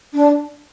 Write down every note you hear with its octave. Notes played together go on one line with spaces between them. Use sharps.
D4